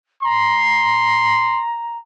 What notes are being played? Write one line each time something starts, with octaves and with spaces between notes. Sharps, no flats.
A#5 C6